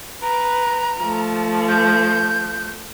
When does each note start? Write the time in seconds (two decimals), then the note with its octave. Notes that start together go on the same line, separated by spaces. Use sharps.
0.22 B4 A#5
1.00 F3 A3
1.69 G6